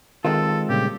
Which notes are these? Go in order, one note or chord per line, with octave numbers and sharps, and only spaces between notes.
D#3 G#3 C4 D#4 F4 A4
A#2 C#3 G3 G4